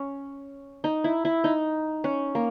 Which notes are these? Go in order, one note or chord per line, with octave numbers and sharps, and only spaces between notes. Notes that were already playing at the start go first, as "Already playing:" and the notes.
Already playing: C#4
D#4
E4
E4
D#4
C#4
A#3